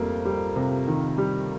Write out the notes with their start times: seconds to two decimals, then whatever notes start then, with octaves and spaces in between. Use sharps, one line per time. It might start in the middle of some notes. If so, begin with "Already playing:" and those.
Already playing: F2 G3 A3 A#3
0.25 G3
0.56 C3
0.88 D#3
1.18 G3